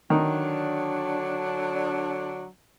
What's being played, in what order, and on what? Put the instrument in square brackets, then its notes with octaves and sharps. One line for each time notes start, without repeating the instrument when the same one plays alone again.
[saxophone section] D3 F#3 D4 [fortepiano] D#3